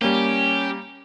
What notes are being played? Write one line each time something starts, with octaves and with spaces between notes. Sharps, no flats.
G3 A#3 C#4 G4